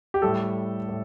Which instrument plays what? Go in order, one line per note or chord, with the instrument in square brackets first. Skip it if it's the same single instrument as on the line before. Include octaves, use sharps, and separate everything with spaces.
[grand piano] G4
A2 G3 A4
A2